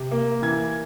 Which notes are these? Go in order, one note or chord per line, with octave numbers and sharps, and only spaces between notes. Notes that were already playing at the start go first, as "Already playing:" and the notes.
Already playing: C3
A#3
E3 G#6